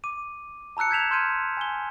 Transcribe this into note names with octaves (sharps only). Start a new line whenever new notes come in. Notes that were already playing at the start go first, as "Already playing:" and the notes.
D6 D#7
A5 A#5 E6 F#6 C#7
G6 G#6 B6 E7 F7
C6 F6 G6 G#6 D#7
G#5 G7